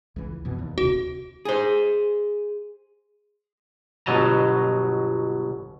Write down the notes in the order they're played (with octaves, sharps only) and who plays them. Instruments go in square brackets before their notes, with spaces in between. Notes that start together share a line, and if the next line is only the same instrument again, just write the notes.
[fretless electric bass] C#2 E3
F2 B2 E3
D#2
[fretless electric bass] D#1 C#2 C3 [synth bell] F#4
[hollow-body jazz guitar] G#4 C5
[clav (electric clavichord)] G1 B2 F#3 D#5 A5 A#5